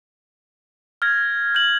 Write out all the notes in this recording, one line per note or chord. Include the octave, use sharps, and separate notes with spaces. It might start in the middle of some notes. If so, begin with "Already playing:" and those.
F6 G#6 A#6
G6 F#7